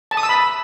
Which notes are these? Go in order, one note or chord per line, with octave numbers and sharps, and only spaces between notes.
A5
D#6
E6
B5